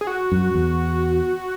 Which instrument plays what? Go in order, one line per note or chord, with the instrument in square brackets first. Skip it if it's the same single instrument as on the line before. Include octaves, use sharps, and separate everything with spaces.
[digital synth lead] G#4
F#4
[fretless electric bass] F#2
E2